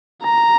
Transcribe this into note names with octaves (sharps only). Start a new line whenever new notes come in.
A#5